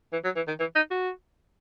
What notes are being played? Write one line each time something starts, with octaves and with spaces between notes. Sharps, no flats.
E3
F#3
E3
D#3
E3
D#4
F#4